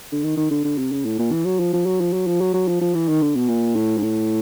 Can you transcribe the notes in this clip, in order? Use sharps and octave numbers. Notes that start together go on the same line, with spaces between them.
D3
D#3
D#3
D3
D3
C3
C#3
A2
A#2
E3
F#3
F3
F3
F#3
F3
F#3
F3
F#3
F#3
F3
F3
E3
D#3
D3
B2
A#2
A2
G#2
A2